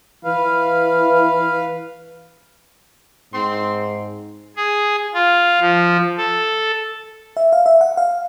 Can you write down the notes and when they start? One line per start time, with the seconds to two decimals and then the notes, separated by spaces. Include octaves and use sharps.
0.25 E3 B4 F5
3.33 G#2 C4 C6
4.56 G#4
5.14 F4
5.61 F3
6.18 A4
7.37 E5
7.53 F5
7.66 E5
7.81 F#5
7.97 F5